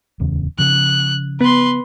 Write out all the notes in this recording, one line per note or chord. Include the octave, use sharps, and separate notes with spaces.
D1 E2 C#3
C#3 F3 F#6
B3 B4 C6